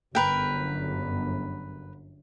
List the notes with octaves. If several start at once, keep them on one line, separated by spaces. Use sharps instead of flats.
G1 F#2 A#4 B4 G5